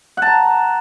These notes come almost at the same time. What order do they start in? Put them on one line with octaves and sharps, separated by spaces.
F#5 A5 A#5